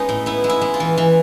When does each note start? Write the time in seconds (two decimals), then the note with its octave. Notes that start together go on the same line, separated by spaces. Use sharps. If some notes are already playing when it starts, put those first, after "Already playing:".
Already playing: G#3 B3 C#4 D#4
0.09 A2
0.26 B3 E4
0.44 G#3
0.50 E4
0.61 G#3
0.74 F4
0.80 E3
0.97 E3